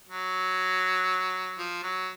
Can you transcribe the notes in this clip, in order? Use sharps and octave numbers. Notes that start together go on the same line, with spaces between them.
F#3
F3
F#3